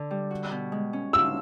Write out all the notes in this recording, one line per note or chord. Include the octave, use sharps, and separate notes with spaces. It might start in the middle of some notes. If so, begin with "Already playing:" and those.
Already playing: D3
G3
F#4
B2
G#3
C#4
F4 E6